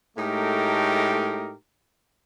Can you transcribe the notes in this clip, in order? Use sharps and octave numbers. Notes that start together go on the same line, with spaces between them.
A2 G#3 A3 D#4 G4 A#4